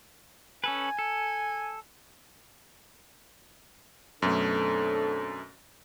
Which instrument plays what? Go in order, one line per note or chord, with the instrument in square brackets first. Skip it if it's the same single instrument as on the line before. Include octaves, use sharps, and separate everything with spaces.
[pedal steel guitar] C#4 A4 B4 [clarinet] G#5
[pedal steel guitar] A4
[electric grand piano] F#2 B2 A3 [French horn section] C4 D4 A4